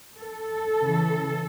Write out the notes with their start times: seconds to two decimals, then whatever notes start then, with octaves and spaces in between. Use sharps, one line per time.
0.19 A4
0.80 C#3 E3